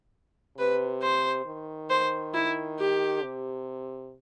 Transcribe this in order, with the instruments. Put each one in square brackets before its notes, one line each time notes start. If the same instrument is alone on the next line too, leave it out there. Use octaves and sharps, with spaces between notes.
[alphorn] C3 [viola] B4
[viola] C5
[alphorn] D#3
[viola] C5
E4
G4
[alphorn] C3